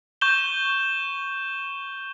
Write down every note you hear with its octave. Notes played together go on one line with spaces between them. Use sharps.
C#6 G6 E7 G7